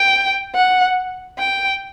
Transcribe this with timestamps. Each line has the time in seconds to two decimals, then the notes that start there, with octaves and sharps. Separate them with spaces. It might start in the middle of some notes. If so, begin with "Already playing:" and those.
Already playing: G5
0.55 F#5
1.39 G5